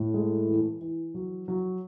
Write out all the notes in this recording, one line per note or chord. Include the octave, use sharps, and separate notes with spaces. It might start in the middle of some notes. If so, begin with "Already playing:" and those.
Already playing: A2
G#3
E3
E3
F#3
F#3